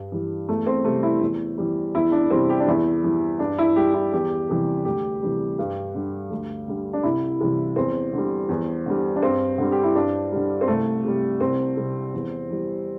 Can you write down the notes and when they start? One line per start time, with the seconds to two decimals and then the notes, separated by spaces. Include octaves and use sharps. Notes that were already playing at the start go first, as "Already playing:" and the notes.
Already playing: G2
0.12 E3 G3
0.48 E2 A3
0.66 C4
0.85 C3 G3 A3
1.03 E4
1.21 E2
1.58 E3 G3
1.95 E2 E4
2.12 D4
2.30 C3 E3 G3 C4
2.49 G4
2.60 D4
2.67 E2 E4
3.04 E3 G3
3.39 G2 D4
3.58 E4
3.76 G3 G4
3.94 E4
4.13 E2 G4
4.49 C3 E3 G3
4.85 D2 G4
5.22 C3 E3 G3
5.59 G2
5.94 D3 G3
6.31 D2
6.68 D3 G3
6.93 D4
7.03 C2 E4
7.40 C3 E3 G3
7.76 E2 C4
8.13 D3 G3
8.49 E2
8.86 D3 G3
9.16 D4
9.22 G2 C4
9.58 D3 G3
9.72 G4
9.84 E4
9.95 G2 D4
10.32 D3 G3
10.61 C4
10.68 C2 A3
11.04 C3 G3
11.40 C2 C4
11.77 C3 G3
12.14 E2
12.50 E3 G3